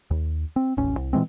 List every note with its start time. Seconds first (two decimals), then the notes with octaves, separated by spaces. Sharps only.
0.11 D#2
0.56 C4
0.77 D#1 A1 C#4
0.97 C2
1.13 A#2 E3 G#3 C4